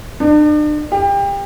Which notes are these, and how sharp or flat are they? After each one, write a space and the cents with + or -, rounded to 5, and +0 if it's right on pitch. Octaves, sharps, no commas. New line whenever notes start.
D4 +40
G4 +30